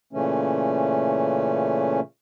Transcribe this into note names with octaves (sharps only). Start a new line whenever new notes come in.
A#2 C#3 E3 A3 C#4